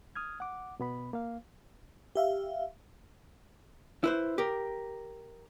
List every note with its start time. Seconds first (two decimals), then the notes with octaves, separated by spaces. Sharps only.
0.16 D#6 F6 G#6
0.40 F#5 D6
0.80 B2 B3 B5
1.13 A#3 F5
2.15 G4 E5 F5
4.04 E4 B4 C5
4.38 G4 A#4